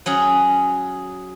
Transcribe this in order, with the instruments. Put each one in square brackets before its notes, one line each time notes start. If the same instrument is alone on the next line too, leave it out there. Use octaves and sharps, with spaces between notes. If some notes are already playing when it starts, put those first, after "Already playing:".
[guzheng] F#3 C#4 G#4